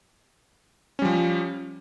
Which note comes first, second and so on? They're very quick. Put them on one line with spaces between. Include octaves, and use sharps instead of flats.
C#4 G3 F3